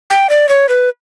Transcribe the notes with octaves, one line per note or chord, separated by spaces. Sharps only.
G5
D5
C#5
B4